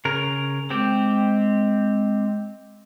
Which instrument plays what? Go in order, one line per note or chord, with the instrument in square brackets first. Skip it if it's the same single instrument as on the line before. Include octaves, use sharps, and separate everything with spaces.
[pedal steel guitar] C#3 A#4
[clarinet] G#3 [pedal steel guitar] C4 G4